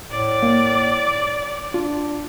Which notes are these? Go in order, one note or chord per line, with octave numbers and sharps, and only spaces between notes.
A2 D5
A#3
D4 F4